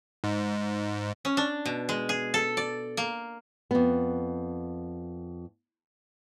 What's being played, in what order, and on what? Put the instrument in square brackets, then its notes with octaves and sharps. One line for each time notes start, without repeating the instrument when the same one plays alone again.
[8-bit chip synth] G#2
[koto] C#4
D4
B2
G#3
G#4
A4
D5
A#3
[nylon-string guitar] F2 B3